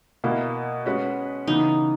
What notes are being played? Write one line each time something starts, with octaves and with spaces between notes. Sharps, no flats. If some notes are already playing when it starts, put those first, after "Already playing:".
B2 A#3 E4
G#3 C#4 F#4 B4
C#3 E3 B3 D#4